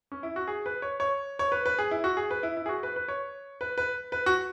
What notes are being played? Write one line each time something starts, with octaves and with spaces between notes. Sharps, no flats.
C#4
E4
F#4
G#4
B4
C#5
C#5
C#5
B4
B4
G#4
E4
F#4
G#4
B4
E4
E4
G#4
F#4
B4
B4
C#5
B4
B4
B4
F#4